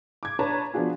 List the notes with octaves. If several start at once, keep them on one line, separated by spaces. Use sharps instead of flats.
D6 G#6
D4 B4 C#5 A5 A#5
F3 B3 D4 F#4 G#4